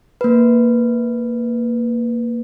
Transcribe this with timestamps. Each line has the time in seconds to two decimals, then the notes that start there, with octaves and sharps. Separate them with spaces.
0.21 A#3 B4